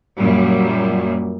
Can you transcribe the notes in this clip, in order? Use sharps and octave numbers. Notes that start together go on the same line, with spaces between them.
F#2 A#2 F#3 G3